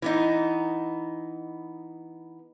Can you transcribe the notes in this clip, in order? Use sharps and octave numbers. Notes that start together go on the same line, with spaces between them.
E3 B3 D#4